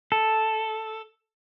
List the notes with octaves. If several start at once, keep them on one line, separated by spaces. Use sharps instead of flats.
A4